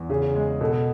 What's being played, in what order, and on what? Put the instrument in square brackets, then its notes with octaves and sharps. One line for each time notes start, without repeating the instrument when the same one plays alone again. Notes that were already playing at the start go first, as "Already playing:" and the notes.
Already playing: [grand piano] E2
[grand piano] C#3 [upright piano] G#4
[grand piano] G#3
[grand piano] B2 [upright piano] A4